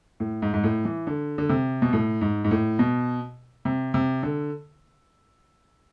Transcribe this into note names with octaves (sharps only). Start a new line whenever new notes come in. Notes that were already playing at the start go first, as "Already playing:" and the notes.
A2
G#2
G#2
A2
E3
D3
D3
C3
B2
A2
G#2
G#2
A2
B2
C3
C3
D3